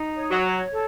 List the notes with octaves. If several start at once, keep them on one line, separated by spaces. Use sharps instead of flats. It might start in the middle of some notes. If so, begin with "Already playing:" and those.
Already playing: D#4
C#5
F#3
C#5
A4